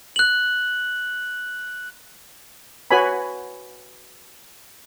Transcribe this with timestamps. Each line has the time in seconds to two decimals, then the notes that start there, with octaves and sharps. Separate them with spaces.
0.16 F#6 F#7
2.91 F#4 B4 C#5 G#5 B5